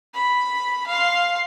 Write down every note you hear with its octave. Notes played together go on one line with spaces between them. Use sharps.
B5
F5 C6